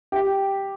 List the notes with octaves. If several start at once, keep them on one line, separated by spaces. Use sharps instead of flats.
G4